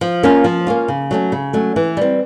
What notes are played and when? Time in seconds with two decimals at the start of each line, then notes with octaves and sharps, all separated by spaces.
0.01 F3
0.23 A#3 C#4 F4
0.44 F3
0.67 A#3 C#4 F4
0.88 C#3
1.11 F#3 A3 C#4
1.32 C#3
1.53 F#3 A3 C#4
1.76 E3
1.97 G3 C4